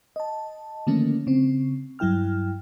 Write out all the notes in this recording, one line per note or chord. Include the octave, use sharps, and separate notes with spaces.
D#5 A5
D3 D#3 F3 A3 A#3 C#4
C#3 C4
G2 F#3 E4 G5 F6